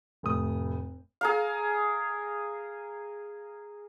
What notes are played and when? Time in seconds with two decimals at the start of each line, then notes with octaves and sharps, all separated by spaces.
0.23 F1 A2 D#6
1.21 G#4 A#4 F5